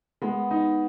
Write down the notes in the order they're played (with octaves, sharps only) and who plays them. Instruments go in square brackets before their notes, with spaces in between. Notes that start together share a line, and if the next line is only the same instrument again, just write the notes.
[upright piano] G#3 [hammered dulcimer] B3
[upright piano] D#4